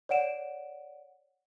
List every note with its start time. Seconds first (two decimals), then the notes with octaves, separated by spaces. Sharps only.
0.09 C#5 D5 F#5 D7 E7